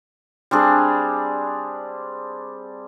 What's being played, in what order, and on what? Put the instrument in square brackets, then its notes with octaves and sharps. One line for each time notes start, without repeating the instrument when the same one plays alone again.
[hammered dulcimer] G3 C4 D4 G#4